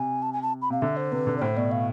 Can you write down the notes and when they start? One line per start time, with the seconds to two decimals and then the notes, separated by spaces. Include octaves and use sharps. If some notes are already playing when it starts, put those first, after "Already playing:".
Already playing: C3 G#5
0.22 A5
0.33 G#5
0.42 A5
0.62 B5
0.70 C3 F5
0.82 D3 E5
0.97 C5
1.12 C3 B4
1.27 D3
1.38 D5
1.41 A2 C5
1.56 B2 D5
1.71 F5